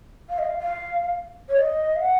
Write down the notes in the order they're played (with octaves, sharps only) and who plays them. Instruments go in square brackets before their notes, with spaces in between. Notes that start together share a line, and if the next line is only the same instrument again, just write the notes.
[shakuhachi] F5
D#5
F5
F5
C#5
D#5
F5
F#5